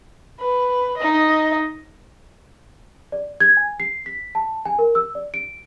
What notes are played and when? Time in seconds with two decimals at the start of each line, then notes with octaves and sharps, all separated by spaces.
0.40 B4
0.97 D#4 D#5
3.12 D5
3.40 G#6
3.57 G#5
3.80 C7
4.06 B6
4.35 A5
4.65 G#5
4.79 A#4
4.95 E6
5.15 D5
5.34 D7